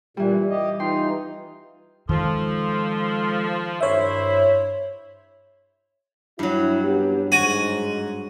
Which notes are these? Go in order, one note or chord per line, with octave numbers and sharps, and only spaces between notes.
G2 A#2 E3 G3
G4 D#5
E3 D#4 F4 G5 C6
D#3 F3 G#3 A4 C6
C2 G2 E4 C5 C#5 E5
G2 F#3 E4
B3 C#4 G4
G#2 F#4 G#5